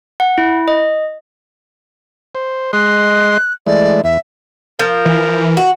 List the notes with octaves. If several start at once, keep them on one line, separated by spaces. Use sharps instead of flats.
F#5
E4
D#5
C5
G#3 D#5 C6 F#6
E3 G#3 A3 D5
E2 E5
F3 A#4
E3
F#4